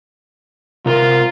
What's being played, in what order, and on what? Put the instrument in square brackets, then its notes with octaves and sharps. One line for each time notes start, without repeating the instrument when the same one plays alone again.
[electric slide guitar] C3 A#4 [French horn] F4